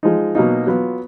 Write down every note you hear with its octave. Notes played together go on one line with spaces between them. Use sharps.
F3 G#3 D#4
B2 F#3 A#3 D#4
F#3 B3 F4